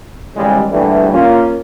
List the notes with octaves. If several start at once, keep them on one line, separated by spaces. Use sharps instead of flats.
A1 D#2 C#3 G3 G#3
A#1 G2 D3 E3 G3 A3
A#3 C#4 F4